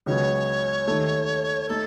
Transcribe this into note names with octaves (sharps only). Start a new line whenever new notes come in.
C#2 C#3 F#3 B3 C#5
D#2 D#3 A3
A3 D#4 A4